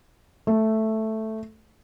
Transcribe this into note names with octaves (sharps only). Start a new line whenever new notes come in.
A3